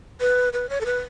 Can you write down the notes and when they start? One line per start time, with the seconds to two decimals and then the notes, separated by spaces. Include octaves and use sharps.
0.21 B4
0.53 B4
0.70 C#5
0.81 A4
0.86 B4